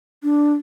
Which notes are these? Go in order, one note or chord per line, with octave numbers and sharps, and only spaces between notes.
D4